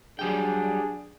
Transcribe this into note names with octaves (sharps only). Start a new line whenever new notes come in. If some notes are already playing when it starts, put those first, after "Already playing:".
F#3 G3 D4 G#4 G5